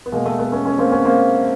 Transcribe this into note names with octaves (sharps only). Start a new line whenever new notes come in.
B3
B2 G#3 A#3
A3
A3 B3
B3 C#4
B3 C#4
A#3 C4
B3 C#4
A#3 C4